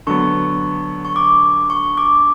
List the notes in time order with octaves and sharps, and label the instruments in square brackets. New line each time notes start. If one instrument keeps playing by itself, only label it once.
[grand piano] D3 F#3 B3 [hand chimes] C#6
[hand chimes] C#6
D6
C#6
D6